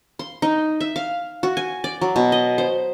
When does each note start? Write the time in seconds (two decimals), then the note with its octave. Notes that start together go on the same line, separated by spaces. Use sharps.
0.19 C6
0.42 D#4
0.81 E5
0.96 F5
1.43 F#4
1.57 G#5
1.84 D5
2.01 F#3
2.16 B2
2.32 D#5
2.58 C5